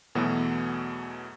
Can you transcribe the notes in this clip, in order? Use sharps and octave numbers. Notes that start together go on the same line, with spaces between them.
E2 B2 E3 F#3 A3 B3